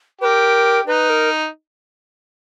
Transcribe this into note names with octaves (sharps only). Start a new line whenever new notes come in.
G4 A#4 B4
D#4 B4
A#4